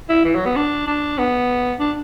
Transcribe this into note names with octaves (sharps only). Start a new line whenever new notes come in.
E4
E3
F#3
B3
D4
D4
B3
D4